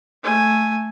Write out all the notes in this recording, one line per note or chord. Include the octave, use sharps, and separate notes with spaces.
A3 G#5